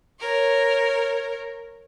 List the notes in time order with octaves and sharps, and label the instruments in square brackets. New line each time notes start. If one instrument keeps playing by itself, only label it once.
[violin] A#4 C#5